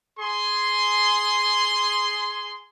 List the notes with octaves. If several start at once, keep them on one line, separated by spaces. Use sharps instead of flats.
G#4 C6